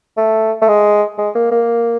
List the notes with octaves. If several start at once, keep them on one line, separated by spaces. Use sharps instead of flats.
A3
A3
G#3
G#3
A#3
A#3